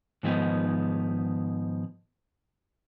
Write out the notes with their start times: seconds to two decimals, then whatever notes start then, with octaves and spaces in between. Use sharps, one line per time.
0.23 G#2 D#3 F3 B3 D#4